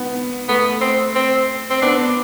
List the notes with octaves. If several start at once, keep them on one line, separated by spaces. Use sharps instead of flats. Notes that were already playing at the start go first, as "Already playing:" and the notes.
Already playing: B3
A3 B3
C4
C4
C4
B3 D4